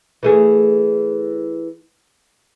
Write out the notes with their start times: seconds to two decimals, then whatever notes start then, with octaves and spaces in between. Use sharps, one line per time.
0.23 E3 A3 G#4